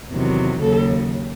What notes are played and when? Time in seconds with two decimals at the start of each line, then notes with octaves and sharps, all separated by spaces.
0.12 E2 C3 D#3 F#3
0.60 D#2 C#3 F#3 A4